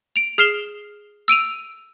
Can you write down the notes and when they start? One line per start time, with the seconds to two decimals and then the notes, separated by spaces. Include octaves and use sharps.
0.16 D7 F7
0.38 G#4 F6 C7 E7 G7
1.28 E6 D7 D#7 F7